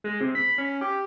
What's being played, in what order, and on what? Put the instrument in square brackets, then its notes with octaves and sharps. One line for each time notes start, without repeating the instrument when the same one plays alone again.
[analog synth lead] G#3
C3
B5
C#4
G4